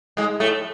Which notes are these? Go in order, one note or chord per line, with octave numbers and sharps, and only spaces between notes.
G#2 G#3
A2 A3